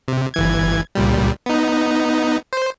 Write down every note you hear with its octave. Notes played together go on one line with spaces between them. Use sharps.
C3
G1 E3 G#6
C#2 A#2 G3
B3 D#4
C5